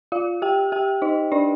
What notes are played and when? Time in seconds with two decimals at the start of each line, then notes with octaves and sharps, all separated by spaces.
0.12 F4 F5
0.42 G4 G5
0.72 G4 G5
1.02 D#4 D#5
1.32 D4 D5